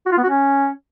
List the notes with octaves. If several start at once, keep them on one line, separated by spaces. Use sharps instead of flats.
F#4
F4
B3
F#4
C#4